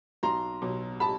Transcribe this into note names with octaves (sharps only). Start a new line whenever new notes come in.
B1 A#5 C6
B2 F#3
A5 B5